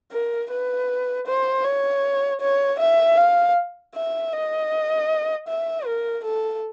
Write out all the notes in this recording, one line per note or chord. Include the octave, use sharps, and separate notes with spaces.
A#4
B4
C5
C#5
C#5
E5
F5
E5
D#5
E5
A#4
A4